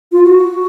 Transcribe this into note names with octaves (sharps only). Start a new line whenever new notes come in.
F4
F#4